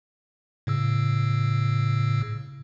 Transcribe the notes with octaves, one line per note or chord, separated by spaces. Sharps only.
A2 C#3 E6